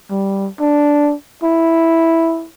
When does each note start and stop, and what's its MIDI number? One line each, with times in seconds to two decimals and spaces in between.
0.10 0.49 55
0.60 1.14 62
1.43 2.48 64